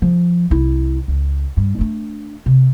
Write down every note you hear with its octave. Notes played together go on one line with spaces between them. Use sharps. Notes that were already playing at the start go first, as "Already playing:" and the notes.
F3
C2 E4
C#2
G2
A3 D4
C3